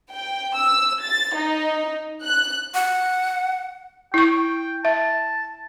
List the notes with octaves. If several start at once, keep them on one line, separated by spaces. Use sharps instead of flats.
G5
E6
A6
D#4
F#6
F#5
E4 G5 C#6
E5 A5